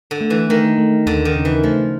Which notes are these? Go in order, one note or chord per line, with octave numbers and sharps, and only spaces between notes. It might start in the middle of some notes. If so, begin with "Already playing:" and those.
D3
A3
E3
D#3 A3
A3
D#2 D3
D#3
C#3
E3
F3 A3